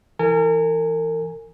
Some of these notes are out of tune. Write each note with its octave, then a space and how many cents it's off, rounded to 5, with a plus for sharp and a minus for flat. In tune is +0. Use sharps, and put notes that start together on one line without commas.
E3 +0 A#4 -40 G#5 +0